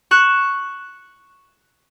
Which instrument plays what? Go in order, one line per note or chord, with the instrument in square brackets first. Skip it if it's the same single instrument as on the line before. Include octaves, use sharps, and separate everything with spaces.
[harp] C#6 F#6 E7